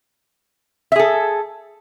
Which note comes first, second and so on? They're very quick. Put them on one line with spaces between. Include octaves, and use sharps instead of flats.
E5 G#4 A4